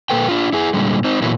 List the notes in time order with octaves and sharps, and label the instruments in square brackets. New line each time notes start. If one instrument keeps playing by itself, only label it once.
[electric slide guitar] A#2 F3 A#3 A4 B4 G5
D4 F4
E4 G#4
A#2 D3 G3 G#3
C4 D#4
A#2 E3 F#3 A#3 B3 E4